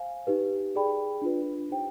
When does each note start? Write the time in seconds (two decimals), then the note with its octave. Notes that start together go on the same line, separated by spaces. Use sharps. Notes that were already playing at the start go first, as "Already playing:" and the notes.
Already playing: C5 F5 G#5
0.27 D#4 G4 B4
0.74 D#4 G#4 D5 G5 B5
1.22 D4 F4 B4
1.70 D#4 G4 C5 G5